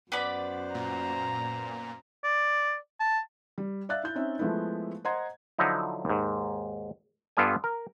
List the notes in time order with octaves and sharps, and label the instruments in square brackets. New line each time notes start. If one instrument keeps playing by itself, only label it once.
[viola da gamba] F#2 C5 [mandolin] B3 D5 B5
[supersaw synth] A#2 [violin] A#5
[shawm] D5
A5
[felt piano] G3
D5 E5 F5 F#6 A6
E4 G6
C4 C#4 D#4 E5
F3 G#3 A3 B3 E4
C5 D#5 F#5 A#5 C6 G#6
[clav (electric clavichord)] D3 F3 F#3 D#4 E4
D#2 G#2
G2 B3 F4 A4 D5 G#5
A#4